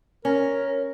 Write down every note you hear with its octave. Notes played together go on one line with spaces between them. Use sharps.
C#4 A#4